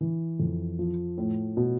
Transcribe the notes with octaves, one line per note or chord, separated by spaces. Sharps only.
E3
F2
F3
A2
B2